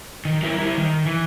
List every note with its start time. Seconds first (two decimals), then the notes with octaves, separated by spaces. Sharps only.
0.25 D#3
0.43 F#3 E4 A#4
0.58 G3 E4
0.77 D#3
1.06 E3